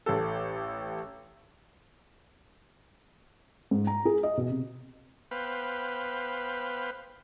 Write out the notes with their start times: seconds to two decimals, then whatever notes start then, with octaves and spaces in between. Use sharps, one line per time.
0.06 A1 G4 A4
3.71 G#2
3.87 A#5
4.05 G#4
4.23 D#5
4.37 B2
4.49 C3
5.31 B3 B4 C5 F5 G5